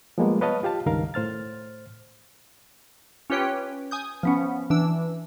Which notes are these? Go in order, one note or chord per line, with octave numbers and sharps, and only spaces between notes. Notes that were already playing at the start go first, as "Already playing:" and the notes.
F3 G3 G#3 A#3 B3
B4 C#5 D#5 F5 A5
F4 G4 F5 A5
C#2 G2 D#3 A#4 F5
A2 C5 F6 A6
C#4 F4 G4 B4 C#5 G5
G#5 D#6 G6
F3 B3 C#4
E3 D4 E6